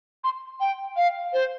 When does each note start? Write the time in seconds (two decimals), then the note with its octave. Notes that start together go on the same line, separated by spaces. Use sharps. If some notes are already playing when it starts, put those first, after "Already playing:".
0.24 C6
0.60 G5
0.97 F5
1.33 C5